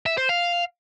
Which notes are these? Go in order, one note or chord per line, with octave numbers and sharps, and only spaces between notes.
E5
C5
F5